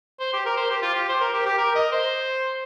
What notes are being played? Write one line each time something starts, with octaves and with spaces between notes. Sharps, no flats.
C5
G4
A#4
C5
G4
F4
G4
C5
A#4
G4
G4
A#4
D#5
C5